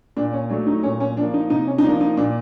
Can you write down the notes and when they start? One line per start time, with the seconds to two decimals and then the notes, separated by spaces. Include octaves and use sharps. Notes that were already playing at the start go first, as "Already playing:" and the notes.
0.17 A#2 D4
0.33 C#4
0.50 F#3 A3 D4
0.67 D#4
0.83 A#2 C#4
1.00 C#4
1.17 F3 A#3 D4
1.34 D#4
1.50 C3 D#4
1.67 C#4
1.78 D#4
1.84 F3 A#3 D4
2.01 D#4
2.17 A#2 D4